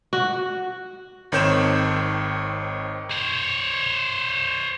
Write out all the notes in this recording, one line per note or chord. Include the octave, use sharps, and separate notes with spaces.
F#4
G#1 D#3 C4 C#5 G6 E7
C5 C#5